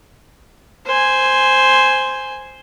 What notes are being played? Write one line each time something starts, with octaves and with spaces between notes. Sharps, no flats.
C5 G#5